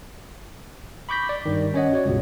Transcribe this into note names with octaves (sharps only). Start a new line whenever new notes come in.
B5 C#6 D6 G6 A#6 B6
D5
G2 D#3
C#4 C#5 D#5 F#5
F#4 C#5 D5
C#2 G2 B2